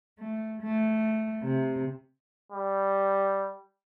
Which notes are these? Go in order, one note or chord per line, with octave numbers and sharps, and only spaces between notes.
A3
A3
C3
G3